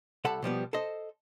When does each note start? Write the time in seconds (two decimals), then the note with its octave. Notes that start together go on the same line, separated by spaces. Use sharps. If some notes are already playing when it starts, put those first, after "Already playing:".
0.25 C2 A4 F#5 A5 B5
0.42 B2 F3 G3 B3
0.73 A4 C5 D#5